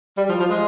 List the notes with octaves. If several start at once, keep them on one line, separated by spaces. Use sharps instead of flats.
G3
F3
F3
G#3